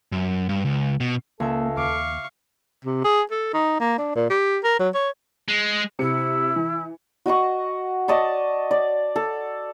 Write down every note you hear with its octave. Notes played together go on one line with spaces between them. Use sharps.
F#2
G2
C#2
B2
C#2 A#3 A4 E5
D#2 F5 C#6 D6
C3
G#4
A4
D#4
A#3
D4
A#2
G4
A#4
F#3
C#5
G#3
C3 E4 C#7
E3
F#4 D#5 F#5 C#6
D5 D#5 A5 C#6
D5
A4